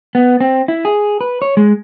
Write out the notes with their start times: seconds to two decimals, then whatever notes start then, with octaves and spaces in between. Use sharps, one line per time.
0.15 B3
0.41 C4
0.68 E4
0.85 G#4
1.21 B4
1.42 C#5
1.57 G#3